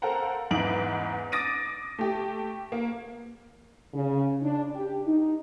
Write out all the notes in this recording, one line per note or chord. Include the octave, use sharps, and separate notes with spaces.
A4 A#4 C5 F5 F#5 A#5
E2 G#2 E3 D#4 D7 F#7
D6 D#6 A6 A#6 D7 D#7
A3 G4
A#3
C#3
D4
G4
D#4